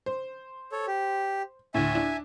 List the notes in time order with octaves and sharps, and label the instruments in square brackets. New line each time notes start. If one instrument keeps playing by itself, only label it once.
[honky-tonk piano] C5
[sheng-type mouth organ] A4 C#5
G4
[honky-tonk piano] D2 A2 [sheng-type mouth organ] E5 G#5
[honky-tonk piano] D4 E4